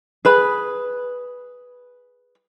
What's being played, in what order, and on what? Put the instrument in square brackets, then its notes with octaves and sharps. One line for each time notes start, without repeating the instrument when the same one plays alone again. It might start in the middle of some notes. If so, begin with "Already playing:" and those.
[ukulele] G#4 B4 B5